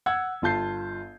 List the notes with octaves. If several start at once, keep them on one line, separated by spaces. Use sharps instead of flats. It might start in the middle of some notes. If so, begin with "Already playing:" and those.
F#5 E6 G#6
G1 F4 A5 G6 C7